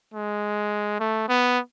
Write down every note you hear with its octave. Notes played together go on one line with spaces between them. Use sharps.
G#3
A3
B3